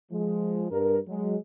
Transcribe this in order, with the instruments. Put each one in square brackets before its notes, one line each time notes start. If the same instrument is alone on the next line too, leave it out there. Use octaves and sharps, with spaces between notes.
[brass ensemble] F3 G#3
G2 A#4
F#3 G#3